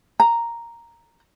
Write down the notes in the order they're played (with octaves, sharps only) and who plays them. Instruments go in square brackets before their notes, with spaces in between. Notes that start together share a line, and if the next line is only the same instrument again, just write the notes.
[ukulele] A#5